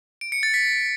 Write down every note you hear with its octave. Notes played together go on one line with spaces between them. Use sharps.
D7
C#7
A6
B6